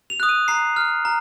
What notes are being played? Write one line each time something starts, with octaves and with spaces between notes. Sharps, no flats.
F7
D#6 F#6
D#7
A#5 C7
F6
A#5